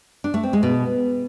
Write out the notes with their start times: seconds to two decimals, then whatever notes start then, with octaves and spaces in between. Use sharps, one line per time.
0.24 D4
0.34 A3
0.43 C4
0.53 G#3
0.63 B2